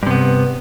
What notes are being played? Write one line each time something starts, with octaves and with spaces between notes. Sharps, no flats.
G2 C3 B3